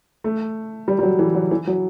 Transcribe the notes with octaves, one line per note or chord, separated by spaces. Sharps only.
A3
G3
G3
F#3
E3
F#3
E3
F#3